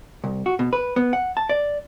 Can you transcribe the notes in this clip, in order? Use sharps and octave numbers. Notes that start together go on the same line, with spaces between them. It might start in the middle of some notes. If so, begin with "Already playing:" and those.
C2
F#4
B2
B4
B3
F#5
A5
D5